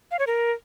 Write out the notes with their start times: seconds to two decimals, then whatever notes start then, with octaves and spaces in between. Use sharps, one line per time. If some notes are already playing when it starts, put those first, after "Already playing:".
0.11 F5
0.19 C#5
0.27 A#4